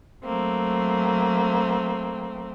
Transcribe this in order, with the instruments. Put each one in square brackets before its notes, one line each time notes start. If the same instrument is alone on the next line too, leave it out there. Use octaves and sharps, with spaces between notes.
[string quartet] F#3 A3 A#3 C4